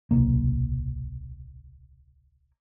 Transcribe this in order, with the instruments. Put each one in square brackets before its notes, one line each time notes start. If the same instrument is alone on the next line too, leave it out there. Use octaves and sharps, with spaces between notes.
[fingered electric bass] D1 B1 C3 A#3